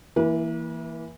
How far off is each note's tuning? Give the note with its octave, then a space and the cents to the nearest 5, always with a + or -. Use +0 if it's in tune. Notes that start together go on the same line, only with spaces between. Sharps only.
E3 +0 A#3 +0 B4 -45